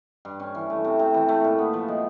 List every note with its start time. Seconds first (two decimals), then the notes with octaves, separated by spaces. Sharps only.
0.25 G2
0.40 C#4
0.55 E3
0.70 A3
0.84 C3
0.99 C3
1.14 E3
1.29 A3
1.44 A#2
1.58 B3
1.73 F3
1.88 G#3